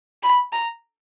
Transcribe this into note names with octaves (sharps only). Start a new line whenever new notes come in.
B5
A#5